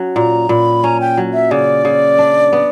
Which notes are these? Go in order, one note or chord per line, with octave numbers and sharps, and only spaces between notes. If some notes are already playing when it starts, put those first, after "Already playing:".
Already playing: F#3 C#4
A#2 A#5
A#2 B5
C#4 A#5
G5
F#3
E5
C#3 D5
C#3
D4
B3